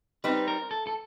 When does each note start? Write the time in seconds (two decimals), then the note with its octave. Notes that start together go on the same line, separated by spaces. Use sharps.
0.24 G3 C4 D#4 B4
0.48 A#4
0.71 A4
0.87 A4